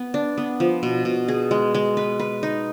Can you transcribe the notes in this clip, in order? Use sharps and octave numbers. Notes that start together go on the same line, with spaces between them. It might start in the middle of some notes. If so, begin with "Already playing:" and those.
Already playing: B3
D4
B3
F3
B2
B2
G#4
G#3
G#3
B4
B4
D#4